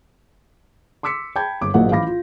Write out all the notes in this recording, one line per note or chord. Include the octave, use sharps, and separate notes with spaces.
C6 D6 E6 B6 C#7
G5 A5 B5 G6 G#6
G1 D6
A#1 G#2 F#3 A#3 F#5
A1 E3 F5 B5 D6 A#6
F4